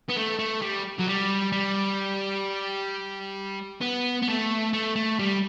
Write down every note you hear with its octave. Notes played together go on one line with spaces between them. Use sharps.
B3
A3
A3
G3
F#3
G3
G3
B3
B3
A3
A3
A3
G3